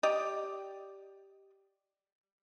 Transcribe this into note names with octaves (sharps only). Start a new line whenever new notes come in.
G4 D5 D#5